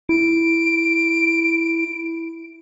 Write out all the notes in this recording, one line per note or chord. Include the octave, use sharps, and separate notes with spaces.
E4 D7